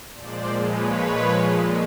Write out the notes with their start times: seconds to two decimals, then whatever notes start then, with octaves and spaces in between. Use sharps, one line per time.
0.13 A#2 F3 G#3 C5 D5
0.62 B4 C#5